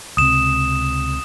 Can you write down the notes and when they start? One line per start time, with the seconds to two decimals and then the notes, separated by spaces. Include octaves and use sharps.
0.17 C#2 C3 D#6 E7